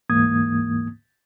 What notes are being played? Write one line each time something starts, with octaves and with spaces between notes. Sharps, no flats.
D2 G#2 E3 A#3 D#6 G#6